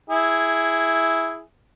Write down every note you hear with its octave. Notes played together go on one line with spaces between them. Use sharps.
E4 G#4